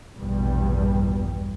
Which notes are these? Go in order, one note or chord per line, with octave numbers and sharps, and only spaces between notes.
A#1 E2 G2 B2 G3